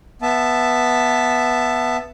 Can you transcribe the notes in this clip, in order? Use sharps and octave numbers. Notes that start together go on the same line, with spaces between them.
B3 E5 A5